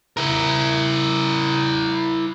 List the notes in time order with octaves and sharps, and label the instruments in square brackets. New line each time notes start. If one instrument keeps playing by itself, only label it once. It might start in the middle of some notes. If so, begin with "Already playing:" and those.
[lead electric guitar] E4 A#4